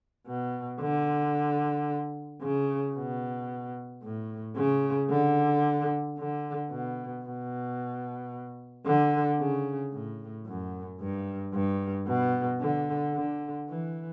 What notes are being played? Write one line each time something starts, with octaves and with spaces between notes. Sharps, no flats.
B2
D3
C#3
B2
A2
C#3
D3
D3
B2
B2
D3
C#3
A2
F#2
G2
G2
B2
D3
D3
E3